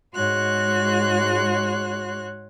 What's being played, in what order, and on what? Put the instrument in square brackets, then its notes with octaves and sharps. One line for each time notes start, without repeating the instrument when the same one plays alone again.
[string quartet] G#2 G#3 F#4 C#5 C6 F#6